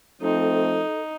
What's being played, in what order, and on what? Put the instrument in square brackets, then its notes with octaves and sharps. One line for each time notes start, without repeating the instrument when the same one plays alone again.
[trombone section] F3 A3 C4 [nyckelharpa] D#4 [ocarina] A4